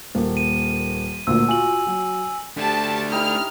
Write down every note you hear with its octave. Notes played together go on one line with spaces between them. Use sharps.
D#1 A#3
D#7
D2 A#2 E6
F4 F#4 G#5 F#7
F#3
A3 D4 G4 A5
D#4 E4 G4 F6